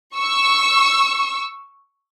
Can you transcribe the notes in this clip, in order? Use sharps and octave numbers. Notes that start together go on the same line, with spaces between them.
C#6 E6